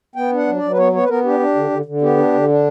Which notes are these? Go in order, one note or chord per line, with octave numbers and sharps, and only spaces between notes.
B3 G5
D4 F#5
F#3
D5
F#3
B4
B3 C#5
B3 C#5
B4
B3 A#4
D4 G4
D4
D3
D3
D3
B3 G4
D4
D3
D4